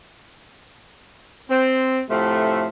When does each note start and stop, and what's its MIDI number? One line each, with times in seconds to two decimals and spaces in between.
1.49 2.00 60
2.10 2.67 45
2.10 2.67 48
2.10 2.67 53
2.10 2.67 57